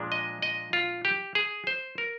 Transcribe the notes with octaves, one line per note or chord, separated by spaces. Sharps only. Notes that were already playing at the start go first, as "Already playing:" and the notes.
Already playing: A#2 F3 G#3 D4
D#5
D#5
F4
G4
G#4
C5
A#4